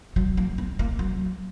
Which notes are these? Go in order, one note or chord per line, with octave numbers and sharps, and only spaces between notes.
F#3
A#3
B3
A#3
F#3